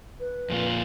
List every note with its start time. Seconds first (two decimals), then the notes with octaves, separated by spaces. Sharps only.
0.20 B4
0.50 F2 A#2 F4